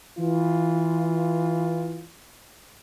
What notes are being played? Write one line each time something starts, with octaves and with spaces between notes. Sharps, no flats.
E3 F4